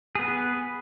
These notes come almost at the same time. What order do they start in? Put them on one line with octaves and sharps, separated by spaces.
G#4 B3 B4